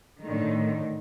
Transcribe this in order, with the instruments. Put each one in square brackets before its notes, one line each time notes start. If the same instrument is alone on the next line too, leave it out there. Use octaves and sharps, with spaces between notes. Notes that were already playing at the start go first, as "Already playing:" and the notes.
[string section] A2 D3 D#3